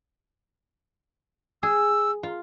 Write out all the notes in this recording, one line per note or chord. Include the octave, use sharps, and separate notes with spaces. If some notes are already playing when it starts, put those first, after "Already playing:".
G#4 E6
F4